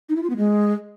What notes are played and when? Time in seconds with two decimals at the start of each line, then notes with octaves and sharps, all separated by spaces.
0.09 D#4
0.16 E4
0.23 F4
0.30 B3
0.37 G#3